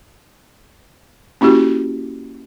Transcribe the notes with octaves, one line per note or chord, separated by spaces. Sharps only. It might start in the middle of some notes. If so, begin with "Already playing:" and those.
A#3 C#4 E4 F#4 G4